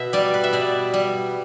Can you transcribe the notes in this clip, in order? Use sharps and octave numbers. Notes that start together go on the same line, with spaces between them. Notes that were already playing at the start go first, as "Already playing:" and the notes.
Already playing: B2 E5
G3 D5
B4
E5
B2 D5
G3